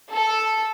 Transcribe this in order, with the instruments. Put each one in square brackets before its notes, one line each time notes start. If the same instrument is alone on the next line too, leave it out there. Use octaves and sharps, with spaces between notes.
[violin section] A4